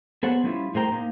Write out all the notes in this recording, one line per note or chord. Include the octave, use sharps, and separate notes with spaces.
B3 G#4 A4 C5 C#5 F#5
G3 C4 C#4 E4 F4
A2 G#4 A#4 C5 G5 A#5
A#3 D#4